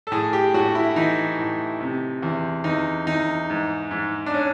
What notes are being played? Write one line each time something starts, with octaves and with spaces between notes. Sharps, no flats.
A4
A2 G#4
G4
A2 F#4
E4
E3 D#4
A2
C3
E2
E2 D#4
E2 D#4
G#2
G#2
D4
C#4